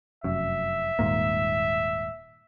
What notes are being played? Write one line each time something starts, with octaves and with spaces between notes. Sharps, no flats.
F1 F#2 E5
D#1 G#2 A#3